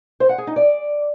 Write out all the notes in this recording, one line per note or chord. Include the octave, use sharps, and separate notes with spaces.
C5
F#5
G#4
D#4
D5